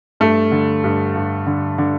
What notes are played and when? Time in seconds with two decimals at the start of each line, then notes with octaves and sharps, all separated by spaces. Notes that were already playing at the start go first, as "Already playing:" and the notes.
0.20 G2 A3
0.52 D3
0.84 G2
1.16 G2
1.47 D3
1.78 D3